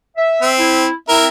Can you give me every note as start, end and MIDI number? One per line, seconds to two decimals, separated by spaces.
0.17 0.50 76
0.42 0.85 60
0.58 0.91 64
1.09 1.27 60
1.09 1.27 64
1.09 1.27 70
1.09 1.27 76